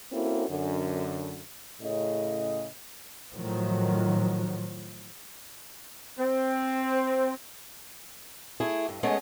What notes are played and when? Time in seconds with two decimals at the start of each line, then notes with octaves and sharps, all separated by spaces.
0.12 A#3 C4 C#4 E4 F#4 A4
0.48 F#2 D3
1.81 A2 C#3 D#5
3.34 A2 D#3 F3 F#3
6.18 C4
8.60 A3 E4 G#4
8.89 G2
9.03 G#3 A3 B3 C#4 G#4 D#5